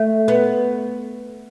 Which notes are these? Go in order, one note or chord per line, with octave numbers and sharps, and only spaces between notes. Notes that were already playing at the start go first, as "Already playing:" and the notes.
Already playing: A3
B3